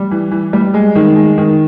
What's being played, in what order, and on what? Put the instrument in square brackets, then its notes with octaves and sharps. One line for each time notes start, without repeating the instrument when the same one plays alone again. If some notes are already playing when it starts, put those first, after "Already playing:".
Already playing: [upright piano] G3
E3
E3
G3
G#3
D#3
G#3
D#3